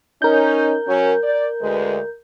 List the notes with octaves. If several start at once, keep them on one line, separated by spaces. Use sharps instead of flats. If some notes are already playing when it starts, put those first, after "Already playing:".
C#4 D#4 A#4 G6
F#3 C#4
D5
D2 G#3 B4